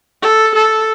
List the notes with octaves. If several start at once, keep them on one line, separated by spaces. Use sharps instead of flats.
A4
A4